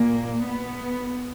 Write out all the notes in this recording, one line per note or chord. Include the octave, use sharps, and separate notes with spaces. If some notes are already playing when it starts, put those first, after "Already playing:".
Already playing: A#2 A#3
B3